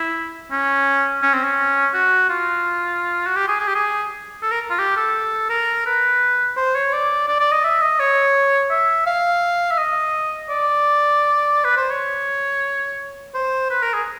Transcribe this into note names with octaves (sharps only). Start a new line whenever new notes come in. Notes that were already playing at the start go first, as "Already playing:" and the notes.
Already playing: E4
C#4
C#4
C4
C#4
F#4
F4
F#4
G4
G#4
G#4
G4
G#4
A4
A#4
F4
G4
A4
A#4
B4
C5
C#5
D5
D5
D5
D#5
E5
D#5
C#5
E5
F5
E5
D#5
D5
B4
C5
C#5
C5
B4
A#4
G#4